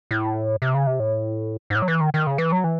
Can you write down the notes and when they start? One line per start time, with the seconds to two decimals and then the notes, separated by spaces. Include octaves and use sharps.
0.11 A2
0.62 C3
0.74 C#3
0.87 C3
1.00 A2
1.70 G#2
1.75 A2
1.82 F#3
1.88 E3
2.01 D#3
2.14 D#3
2.27 C#3
2.38 E3
2.52 F#3
2.64 E3